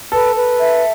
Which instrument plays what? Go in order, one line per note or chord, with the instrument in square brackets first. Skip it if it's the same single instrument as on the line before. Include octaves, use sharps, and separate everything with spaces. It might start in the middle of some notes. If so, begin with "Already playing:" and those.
[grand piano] A4 [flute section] B4
[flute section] B4
E5